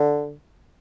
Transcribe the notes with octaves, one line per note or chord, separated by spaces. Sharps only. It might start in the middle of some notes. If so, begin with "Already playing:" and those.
Already playing: D3